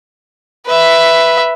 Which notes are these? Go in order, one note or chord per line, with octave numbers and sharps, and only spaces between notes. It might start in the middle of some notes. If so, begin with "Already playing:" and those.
B4 E5